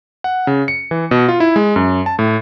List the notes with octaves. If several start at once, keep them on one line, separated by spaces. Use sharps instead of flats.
F#5
C#3
C#7
E3
B2
F4
E4
G#3
F#2
A5
A2